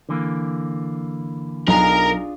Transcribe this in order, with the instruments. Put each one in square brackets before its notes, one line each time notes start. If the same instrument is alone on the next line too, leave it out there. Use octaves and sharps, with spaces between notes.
[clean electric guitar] D3 E3 A#3
[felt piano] B1 [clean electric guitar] D4 F4 G#4 [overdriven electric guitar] A#4 A#5